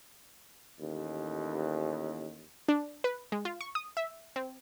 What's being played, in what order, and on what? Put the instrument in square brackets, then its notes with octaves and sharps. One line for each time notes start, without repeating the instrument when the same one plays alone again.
[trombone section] A1 D#2
[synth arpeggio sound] D4
B4
G#3
F4
C#6
D#6
E5
C4